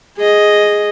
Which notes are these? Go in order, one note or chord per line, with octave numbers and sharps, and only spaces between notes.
G#4 D#5